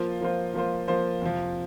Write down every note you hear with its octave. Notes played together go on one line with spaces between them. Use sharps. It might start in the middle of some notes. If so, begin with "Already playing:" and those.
Already playing: F3 A#3 F4 C5
F3 A#3 F4 C5
F3 A#3 F4 C5
F3 A#3 F4 C5
F2 C3 F3